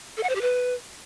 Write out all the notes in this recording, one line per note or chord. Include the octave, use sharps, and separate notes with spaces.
A4
F#5
C5
G4
B4